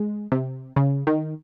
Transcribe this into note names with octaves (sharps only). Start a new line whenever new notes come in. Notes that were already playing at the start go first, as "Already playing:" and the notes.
Already playing: G#3
C3
C#3
D#3